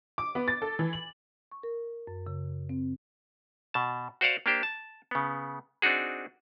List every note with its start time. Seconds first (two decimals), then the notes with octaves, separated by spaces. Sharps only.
0.18 D6
0.35 B3
0.48 A6
0.62 A4
0.79 E3
0.93 F#7
1.52 C#6
1.63 A#4
2.07 F#2
2.27 C#3
2.69 C4
3.74 B2 A5
4.21 F#4 C5 D5 F5 F#5
4.46 A#3 D4 G4 C5
4.63 A5
5.11 C#3 B3
5.82 C4 D4 D#4 F#4 G#4